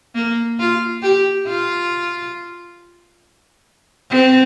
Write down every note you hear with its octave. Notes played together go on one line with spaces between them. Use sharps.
A#3
F4
G4
F4
C4